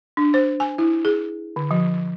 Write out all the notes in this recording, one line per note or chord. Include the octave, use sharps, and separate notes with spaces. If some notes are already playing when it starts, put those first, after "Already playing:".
D4
C5
G#5
E4
G#4
D3
F3